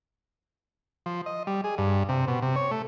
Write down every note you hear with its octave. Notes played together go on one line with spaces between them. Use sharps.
F3
D#5
G3
G#4
G2
C3
B2
C3
C#5
A3